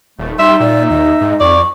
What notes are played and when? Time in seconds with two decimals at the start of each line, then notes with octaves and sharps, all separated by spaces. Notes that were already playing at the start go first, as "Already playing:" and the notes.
0.19 D#1 D#3 F3 A3
0.39 G3 D#4 E5 C6
0.60 A#2 D5 E5
0.90 D#2 D#5
1.21 G#2
1.40 F2 D5 C#6